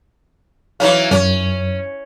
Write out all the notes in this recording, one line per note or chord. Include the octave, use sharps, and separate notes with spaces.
E3 F#3 C#4 F5
F#2 C#4